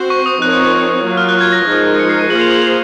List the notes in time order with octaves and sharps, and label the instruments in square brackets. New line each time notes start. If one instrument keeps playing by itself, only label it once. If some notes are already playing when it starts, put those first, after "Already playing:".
Already playing: [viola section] C4 F#4 C5
[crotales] C#6
D#6
[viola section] F3 C4 D#4 A#4 C#5 [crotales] F#6
[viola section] F#3 A#3 F4
[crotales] F6
F#6
G#6
A#6
[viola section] F3 G#3 D#4 A#4
[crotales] C#7
C7
D#7
[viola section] A#3 F4 G#4 C5 [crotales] F#7
[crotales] F7
F#7
F7